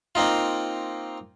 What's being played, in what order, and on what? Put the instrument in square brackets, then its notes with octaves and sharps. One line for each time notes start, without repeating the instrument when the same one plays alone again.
[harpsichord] A#3 C4 D#4 F4